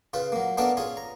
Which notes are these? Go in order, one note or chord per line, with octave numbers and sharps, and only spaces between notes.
C#3 F4 B4
F#3 A#3
A#3 B3 C#4 D4 A4 A#4
C#4 F4 G#4
A#5